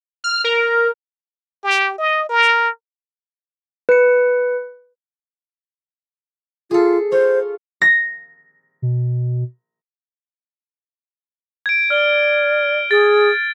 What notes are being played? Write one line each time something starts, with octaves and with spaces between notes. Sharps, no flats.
F6
A#4
G4
D#5
A#4
B4 C#7
F4 G#4 A4
F4 C5 C#5
A#6
B2
G#6 D7
D5 F6 G7
G#4 A6